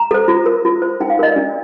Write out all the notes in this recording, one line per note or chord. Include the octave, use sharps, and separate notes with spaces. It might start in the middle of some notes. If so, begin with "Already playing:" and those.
Already playing: A#5
A4 C5
F4
A#4
F4
C5
D#4 G5
F5
A#4 D#5
D5
D4